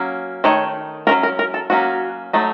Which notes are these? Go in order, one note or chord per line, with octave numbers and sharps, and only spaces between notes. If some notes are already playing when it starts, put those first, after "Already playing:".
Already playing: F#3 A#3 C#4
D#3 A3 C#5
F#3 A3 C#4 A#4
A#4
A#4
A4
F#3 A#3 C#4 F#4
F#3 A3 D#4